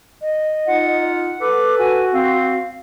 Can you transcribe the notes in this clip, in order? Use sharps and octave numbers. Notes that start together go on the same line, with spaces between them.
D#5
D#4 F4 F#5
A4 B4 D6
F#4 G#5
C4 F5